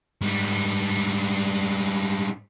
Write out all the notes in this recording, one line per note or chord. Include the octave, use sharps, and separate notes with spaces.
G#2 G3